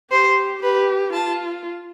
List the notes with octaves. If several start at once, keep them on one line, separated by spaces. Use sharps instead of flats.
G4 C5
G4 B4
F4 A5